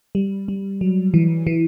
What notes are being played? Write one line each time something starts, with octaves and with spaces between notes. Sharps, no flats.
G3
G3
F#3
E3
E3